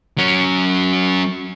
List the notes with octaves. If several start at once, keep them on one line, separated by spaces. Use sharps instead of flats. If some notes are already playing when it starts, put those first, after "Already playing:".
F#3 C#4